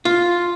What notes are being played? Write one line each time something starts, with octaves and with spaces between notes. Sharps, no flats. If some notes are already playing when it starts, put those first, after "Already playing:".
F4